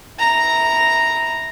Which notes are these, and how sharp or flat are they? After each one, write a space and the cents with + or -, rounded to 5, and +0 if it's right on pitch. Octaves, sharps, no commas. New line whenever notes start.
E4 -20 A#5 -5